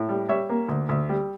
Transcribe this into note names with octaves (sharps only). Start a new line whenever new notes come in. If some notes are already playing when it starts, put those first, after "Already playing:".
Already playing: A2
G3
G3 C#5 E5
A#3
D2
D2
G3